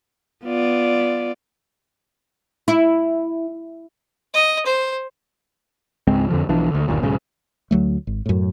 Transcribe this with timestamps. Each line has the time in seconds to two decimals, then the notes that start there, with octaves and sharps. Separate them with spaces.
0.45 B3 F4 D5
2.68 E4
4.34 D#5
4.66 C5
6.07 C#2 G#2 G#3 C4
6.29 F2 D3 F3
6.49 B1 E3 F3 D4
6.71 D2 D3
6.88 G1 D#2 A#2
7.02 B1 G#2 C#3
7.71 D2 F#3 A3
8.07 G#1
8.26 F#2 A2